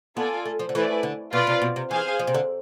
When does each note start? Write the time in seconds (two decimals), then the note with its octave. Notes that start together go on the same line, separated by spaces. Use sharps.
0.16 B3 F4 A4 D5 G#5
0.45 A3
0.59 F3
0.69 D3
0.75 E3 A3 E4 B4 D5 G#5
1.03 D3
1.32 B2 F4 B4 D5 F5
1.47 C3
1.62 B2
1.76 C3
1.91 E3 G#4 C5 F5 G#5
2.19 F3
2.27 C3
2.34 D3